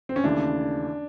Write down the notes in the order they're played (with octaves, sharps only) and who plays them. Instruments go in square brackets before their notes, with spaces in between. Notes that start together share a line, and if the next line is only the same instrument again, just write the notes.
[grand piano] C4
C#4
[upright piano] D#2 C#3 E3 A3 [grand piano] D4